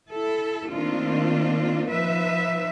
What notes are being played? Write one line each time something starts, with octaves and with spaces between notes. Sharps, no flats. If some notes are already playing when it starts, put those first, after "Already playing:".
E4 A4
D#3 A3 A#3 C4 D4 F4
F3 D#4 B4 E5